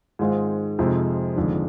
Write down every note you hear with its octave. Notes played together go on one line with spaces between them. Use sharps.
G#2 D#3 G#3 C4 F4
F2 C3 F3 G#3 D#4
G1 F2 D#3 G#3 D4